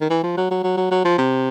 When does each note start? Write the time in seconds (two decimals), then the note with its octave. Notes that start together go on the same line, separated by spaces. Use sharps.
0.01 D#3
0.10 E3
0.23 F3
0.37 F#3
0.50 F#3
0.63 F#3
0.77 F#3
0.91 F#3
1.04 F3
1.18 C3